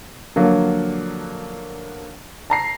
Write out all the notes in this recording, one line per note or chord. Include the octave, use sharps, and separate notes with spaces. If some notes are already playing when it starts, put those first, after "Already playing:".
D3 F3 F#3 A#3
A5 A#5 C7